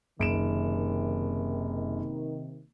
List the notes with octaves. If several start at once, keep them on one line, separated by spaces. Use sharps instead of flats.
F#1 C3 D#3 D7 E7